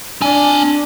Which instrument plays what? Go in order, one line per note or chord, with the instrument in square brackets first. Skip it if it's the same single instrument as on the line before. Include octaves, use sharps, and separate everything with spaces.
[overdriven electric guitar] C4 G#5 [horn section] D4